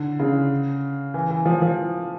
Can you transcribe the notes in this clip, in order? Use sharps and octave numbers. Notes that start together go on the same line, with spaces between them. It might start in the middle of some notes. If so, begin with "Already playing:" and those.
Already playing: D3
C#3
E3
E3
F3
F3